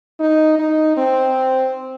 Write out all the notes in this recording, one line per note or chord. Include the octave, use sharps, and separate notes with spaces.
D#4
D#4
C4